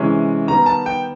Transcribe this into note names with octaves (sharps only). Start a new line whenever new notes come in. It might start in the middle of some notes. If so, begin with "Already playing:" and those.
Already playing: C3 E3 G#3 C#4
D#3 G3 B3 A#5
A5
G5